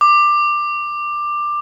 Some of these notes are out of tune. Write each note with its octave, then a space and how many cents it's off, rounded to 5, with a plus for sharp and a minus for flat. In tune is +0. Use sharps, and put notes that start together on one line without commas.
D6 +15